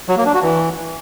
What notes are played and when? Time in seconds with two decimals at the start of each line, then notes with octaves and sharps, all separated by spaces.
0.09 F#3
0.17 A#3
0.26 D4
0.34 F#4
0.42 E3